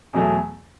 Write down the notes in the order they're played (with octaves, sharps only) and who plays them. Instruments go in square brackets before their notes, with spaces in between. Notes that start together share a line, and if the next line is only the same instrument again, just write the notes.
[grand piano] E2 B2 F#3 A3